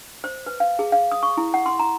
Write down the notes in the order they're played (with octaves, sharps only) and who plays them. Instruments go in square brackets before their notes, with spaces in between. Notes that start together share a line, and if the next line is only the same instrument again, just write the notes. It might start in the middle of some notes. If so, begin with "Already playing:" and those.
[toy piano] C5
B4
F5
G#4
F5
D#6
C#6
E4
F#5
C6
A#5